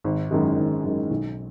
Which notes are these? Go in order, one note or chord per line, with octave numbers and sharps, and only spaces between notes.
G#1
F#2 D#3 G#3
G#1
F#2 D#3 G#3
B1